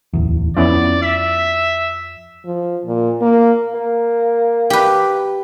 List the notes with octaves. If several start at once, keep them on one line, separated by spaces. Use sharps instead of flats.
D1 E2
F2 B3 C#4 E4 D5
E5 B6
F3
A#2
A#3
A#3
G4 B4